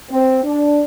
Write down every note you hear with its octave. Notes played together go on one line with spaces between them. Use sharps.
C4
D4